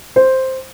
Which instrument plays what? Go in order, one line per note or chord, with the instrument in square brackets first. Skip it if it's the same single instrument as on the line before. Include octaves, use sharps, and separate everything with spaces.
[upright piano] C5